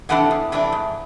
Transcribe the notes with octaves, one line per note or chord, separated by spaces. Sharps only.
C3 E3 A3 D4 F#5
E2
C3 E3 A3 D4
G#2